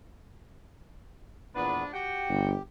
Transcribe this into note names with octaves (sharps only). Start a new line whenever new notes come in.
E2 A#2 F3 G#3 B3 D4 B4
F#4 G4 G5
G1